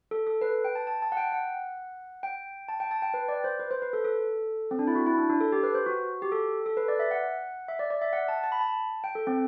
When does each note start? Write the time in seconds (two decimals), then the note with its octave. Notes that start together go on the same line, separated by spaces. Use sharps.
0.11 A4
0.27 A4
0.41 B4
0.65 G5
0.75 A5
0.87 A5
1.02 A5
1.12 F#5
1.17 G5
1.32 F#5
2.23 G5
2.69 A5
2.80 G5
2.91 A5
3.02 G5
3.14 B4
3.29 D5
3.44 C5
3.59 B4
3.71 C5
3.82 B4
3.93 A4
4.05 A4
4.71 C4
4.79 D4
4.87 E4
4.95 F#4
5.06 E4
5.18 D4
5.29 D4
5.40 A4
5.52 G4
5.63 B4
5.75 C5
5.86 F#4
6.22 G4
6.32 A4
6.66 A4
6.77 B4
6.88 D5
6.99 E5
7.11 F#5
7.68 E5
7.79 D5
7.90 D5
8.02 E5
8.13 F#5
8.28 A5
8.44 A5
8.52 B5
8.61 A5
9.04 G5
9.15 A4
9.27 C4